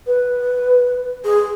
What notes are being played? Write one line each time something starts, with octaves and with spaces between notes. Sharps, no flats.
B4
G#4